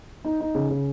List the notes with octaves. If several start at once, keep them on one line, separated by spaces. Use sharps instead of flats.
D#4
D#4
C#3
C#3